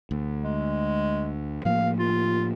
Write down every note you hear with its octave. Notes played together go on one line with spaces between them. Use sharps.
D2
G#3
A2 F3 A#3 F5
F4